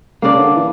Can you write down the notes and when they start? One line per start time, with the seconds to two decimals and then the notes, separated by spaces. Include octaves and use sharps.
0.22 C#3 A#3 D4 A#4 D5
0.39 D3
0.56 E3